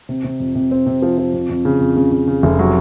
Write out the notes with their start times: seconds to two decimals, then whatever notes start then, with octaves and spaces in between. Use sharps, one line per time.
0.09 C3
0.24 C3
0.40 F2
0.55 C3
0.71 C4
0.86 C3
1.02 F3
1.18 F3
1.34 F2
1.50 F2
1.65 C#3
1.81 F2
1.96 C#3
2.12 C#3
2.27 C#3
2.43 F1
2.59 F#3